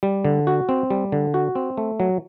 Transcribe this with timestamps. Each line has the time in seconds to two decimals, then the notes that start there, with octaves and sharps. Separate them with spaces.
0.03 G3
0.25 D3
0.47 F#4
0.69 C4
0.90 G3
1.12 D3
1.34 F#4
1.55 C4
1.77 A3
2.00 F#3